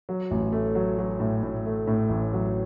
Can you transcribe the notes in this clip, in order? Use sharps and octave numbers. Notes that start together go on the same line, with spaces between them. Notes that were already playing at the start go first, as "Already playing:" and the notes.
F#3
A1
A3
F#3
F#3
A2
A2
A3
A2
A1
F#3